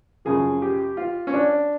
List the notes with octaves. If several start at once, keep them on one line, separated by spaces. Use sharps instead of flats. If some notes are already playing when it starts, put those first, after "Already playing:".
F#2 C#3 F3 G#4
G4
F4
C#4
D4